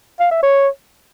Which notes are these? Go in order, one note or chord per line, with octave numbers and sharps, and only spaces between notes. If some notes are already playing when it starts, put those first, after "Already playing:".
F5
E5
C#5